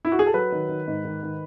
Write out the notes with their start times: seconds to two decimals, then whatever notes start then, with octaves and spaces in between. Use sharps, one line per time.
0.05 E4
0.12 F#4
0.19 G#4
0.26 A4
0.34 F#3 B4
0.52 D#3
0.69 D#3
0.87 G#2
1.05 D#3
1.23 D#3